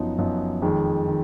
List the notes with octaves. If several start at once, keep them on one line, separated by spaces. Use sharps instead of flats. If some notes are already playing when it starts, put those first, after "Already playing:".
Already playing: F#2 F3 B3 D#4
F#2 F3 B3 D#4
F2 D#3 G#3
D#3